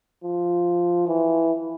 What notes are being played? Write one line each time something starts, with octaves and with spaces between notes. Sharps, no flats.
F3
E3